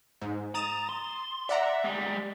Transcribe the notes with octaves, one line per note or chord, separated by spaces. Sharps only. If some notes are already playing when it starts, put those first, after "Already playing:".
G#2
A#5 D#6 A6 E7
C6
D5 E5 F#5 A#5
G3 G#3